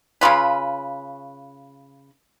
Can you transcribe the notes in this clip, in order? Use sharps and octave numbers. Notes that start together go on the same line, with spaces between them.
C#3 F3 F4 B4